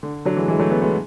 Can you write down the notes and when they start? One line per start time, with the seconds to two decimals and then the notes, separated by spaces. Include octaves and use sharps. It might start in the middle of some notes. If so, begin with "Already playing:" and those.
0.03 D3
0.25 D3 F#3
0.37 E3 G#3
0.48 E3 G#3
0.59 F#3 A3
0.71 G#3 B3
0.82 G#3 B3